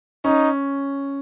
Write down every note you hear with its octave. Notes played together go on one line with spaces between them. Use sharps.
C#4 D#4